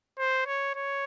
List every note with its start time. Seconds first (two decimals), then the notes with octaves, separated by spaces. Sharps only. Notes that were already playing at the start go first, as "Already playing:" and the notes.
0.18 C5
0.46 C#5
0.75 C#5